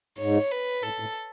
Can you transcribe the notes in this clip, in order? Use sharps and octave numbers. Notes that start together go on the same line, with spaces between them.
G#2 C#5
B4
A2 A4
A2